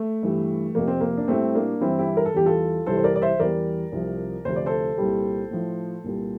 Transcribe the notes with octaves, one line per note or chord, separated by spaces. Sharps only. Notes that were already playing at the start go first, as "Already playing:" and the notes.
Already playing: A3
G2 E3 G3
F2 C3 F3 A#3
C4
A#3
D4
A2 G3 A3 C4
A#3 D4
G2 E3 G3 C4 E4
E4 G4
A#4
A4
E2 E3 G3 G4
F4 A4
C2 C3 E3 G3 A4 C5
C5
A#4 D5
D5
C5 E5
E2 E3 G3 A#4 D5
C2 C3 F3
D2 C3 F3 C5
D5
A4 C5
C2 A#2 G3
A2 F3
C2 A#2 G3